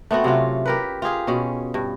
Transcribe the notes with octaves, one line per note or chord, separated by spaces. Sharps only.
A3 B3 C4 F#4
C3 F#3 C#4 F4
G4 A#4 B4
F4 G4 G#4 F5
B2 C#4
G2